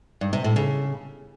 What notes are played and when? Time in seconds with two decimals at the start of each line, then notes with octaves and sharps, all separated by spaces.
0.21 G2
0.33 C3
0.44 A2
0.56 C#3